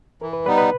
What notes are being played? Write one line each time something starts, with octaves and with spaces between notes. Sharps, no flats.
E3 A#4
B4
G3 B3 D#4 B4
B4